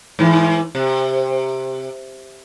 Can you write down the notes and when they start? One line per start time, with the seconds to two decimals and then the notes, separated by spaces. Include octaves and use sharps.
0.19 G#2 E3
0.75 C3